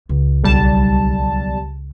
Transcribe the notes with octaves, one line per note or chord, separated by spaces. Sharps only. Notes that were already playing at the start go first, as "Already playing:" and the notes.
C#2
B1 G3 A5